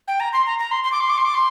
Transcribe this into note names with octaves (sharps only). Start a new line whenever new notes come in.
G5
A#5
C6
A#5
A#5
C6
C6
D6
C6
D6
C6
D6
C6